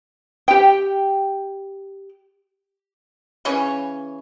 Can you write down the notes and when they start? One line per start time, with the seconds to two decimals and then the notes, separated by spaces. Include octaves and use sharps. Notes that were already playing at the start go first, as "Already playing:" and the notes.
0.48 G4 G5
3.45 C#3 E3 C#4 C#5